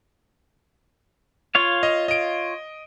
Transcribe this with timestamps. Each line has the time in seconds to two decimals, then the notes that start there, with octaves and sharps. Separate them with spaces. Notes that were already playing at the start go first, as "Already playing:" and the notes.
1.55 F4 C#5 F5
1.83 D#5
2.08 D#5 D7